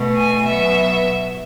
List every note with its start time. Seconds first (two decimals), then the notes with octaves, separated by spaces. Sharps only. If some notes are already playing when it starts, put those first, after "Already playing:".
Already playing: B2 A3
0.16 G#5
0.46 B2 F#3 B3 E5